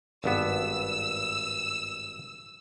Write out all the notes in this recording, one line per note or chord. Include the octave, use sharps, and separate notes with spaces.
G#1 G2 B3 E6